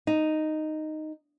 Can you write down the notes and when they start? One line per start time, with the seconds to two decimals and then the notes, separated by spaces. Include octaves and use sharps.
0.07 D#4